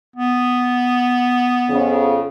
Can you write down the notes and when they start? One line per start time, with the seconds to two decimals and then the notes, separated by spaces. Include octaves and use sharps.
0.16 B3
1.70 F2 C#3